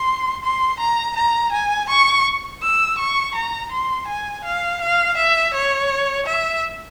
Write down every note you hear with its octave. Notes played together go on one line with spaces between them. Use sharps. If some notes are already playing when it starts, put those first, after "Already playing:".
Already playing: C6
C6
A#5
A#5
G#5
C#6
E6
C#6
A#5
C6
G#5
F5
F5
E5
C#5
E5